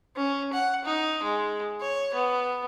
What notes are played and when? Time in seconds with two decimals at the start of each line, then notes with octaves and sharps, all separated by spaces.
0.16 C#4
0.53 F#5
0.85 D#4
1.23 G#3
1.81 C#5
2.14 B3